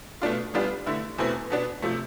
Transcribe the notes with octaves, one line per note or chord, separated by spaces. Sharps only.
B2 A3 D4 F4
E3 G3 B3 D4 F4
D3 A3 E4
E2 B2 A3 C4 E4
B2 B3 D4
C3 F3 A3